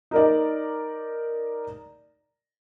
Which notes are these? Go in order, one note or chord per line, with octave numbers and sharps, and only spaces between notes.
D#4 A#4 D5